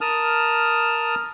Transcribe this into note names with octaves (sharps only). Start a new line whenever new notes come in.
A#4 A5 D#6 F6